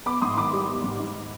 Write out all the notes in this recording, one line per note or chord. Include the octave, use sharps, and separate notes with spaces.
B3 B5 D6
G#2 C6 D#6
D#3 B5 D6
G3
B3
G#2
D#4